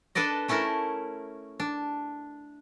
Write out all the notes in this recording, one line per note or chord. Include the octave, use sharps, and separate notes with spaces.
D4 A4 B4 D5 D#5
A3 C#4 E4 A4 A#4
D4